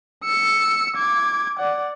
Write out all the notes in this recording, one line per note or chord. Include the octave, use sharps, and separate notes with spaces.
E6 C#7
D6 G#6
D5 F#5